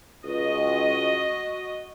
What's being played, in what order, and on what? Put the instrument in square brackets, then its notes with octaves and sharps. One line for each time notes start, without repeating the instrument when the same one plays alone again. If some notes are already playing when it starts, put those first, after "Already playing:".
[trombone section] C#2 [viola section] F#4 D#5